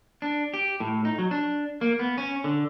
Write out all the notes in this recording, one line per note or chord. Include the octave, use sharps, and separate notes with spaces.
D4
G4
A2
D#4
F#3
D4
A#3
B3
C#4
D3